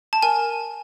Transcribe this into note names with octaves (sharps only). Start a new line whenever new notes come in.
A5
A#4 G#5